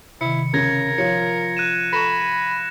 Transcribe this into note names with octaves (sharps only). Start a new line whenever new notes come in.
C3 D#3 E4 C#7
C#3 A#4 G#6 A#6
F3 F4 C#5 C#7
F#6 D#7 E7
A4 A#5 B5 C#6 A#6 E7
D#7